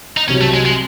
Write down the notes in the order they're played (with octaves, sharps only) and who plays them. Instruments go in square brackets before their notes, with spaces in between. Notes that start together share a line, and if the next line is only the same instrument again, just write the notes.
[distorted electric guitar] D#4
[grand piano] C2 C3 F#3 [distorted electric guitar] C#4
[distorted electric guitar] A3
G#3
G#3